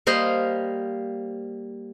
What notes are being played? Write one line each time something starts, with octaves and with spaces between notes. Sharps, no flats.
G3 A#3 C5 D#5 F5